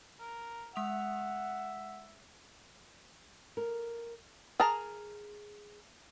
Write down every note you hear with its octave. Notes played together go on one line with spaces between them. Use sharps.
A#4
G#3 E5 F#5 D#6 F7
A#4
G#4 A#4 A5 A#5